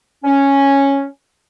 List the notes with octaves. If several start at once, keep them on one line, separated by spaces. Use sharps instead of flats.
C#4